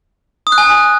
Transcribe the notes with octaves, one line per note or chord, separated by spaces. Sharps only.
D#6
F#6
G#5